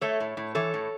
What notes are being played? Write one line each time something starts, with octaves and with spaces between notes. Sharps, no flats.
A3 A4 C#5
A2
A2
E3 A4 C#5
A2